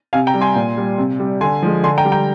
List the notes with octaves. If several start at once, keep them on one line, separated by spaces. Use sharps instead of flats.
C3 F5 G#5
G5 A#5
G3
G#5 C6
A#2
G3
C3
G3
D3 G#5 C6
F3 G#3
D3 G#5 C6
G5 A#5
G3
G5 A#5